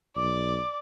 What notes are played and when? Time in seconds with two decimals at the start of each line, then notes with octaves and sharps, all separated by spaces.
0.16 B1 D5 D6